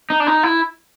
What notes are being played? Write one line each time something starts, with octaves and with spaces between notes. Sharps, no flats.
D#4
D4
D#4
E4